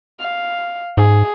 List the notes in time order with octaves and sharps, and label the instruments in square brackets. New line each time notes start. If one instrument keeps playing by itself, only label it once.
[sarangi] F5
[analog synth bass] G#2 [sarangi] G#4